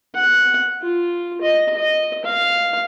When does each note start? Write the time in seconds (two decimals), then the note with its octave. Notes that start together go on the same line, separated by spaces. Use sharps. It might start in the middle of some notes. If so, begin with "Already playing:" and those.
0.15 F#5
0.82 F4
1.42 D#5
1.77 D#5
2.25 F5